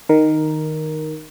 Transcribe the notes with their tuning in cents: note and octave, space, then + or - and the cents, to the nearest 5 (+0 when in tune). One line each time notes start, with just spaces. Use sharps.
D#3 -5 A#4 +5